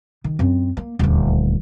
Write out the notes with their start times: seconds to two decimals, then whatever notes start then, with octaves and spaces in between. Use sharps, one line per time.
0.24 D#3
0.39 F#2 C4
0.77 A#3
0.99 D#1 D2